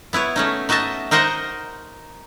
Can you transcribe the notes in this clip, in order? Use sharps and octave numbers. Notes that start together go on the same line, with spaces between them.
B3 E4 B4 C#5
A3 C#4 D#4
D#4 F#4 D#5 E5 A5
D#4 A#4 C5 D#5 F#5